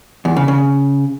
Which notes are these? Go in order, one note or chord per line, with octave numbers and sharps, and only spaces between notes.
E2
C#3
C#3